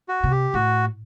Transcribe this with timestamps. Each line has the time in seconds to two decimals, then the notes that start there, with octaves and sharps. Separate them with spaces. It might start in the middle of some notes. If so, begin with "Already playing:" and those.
0.08 F#4
0.24 C3
0.31 G4
0.54 A2 F#4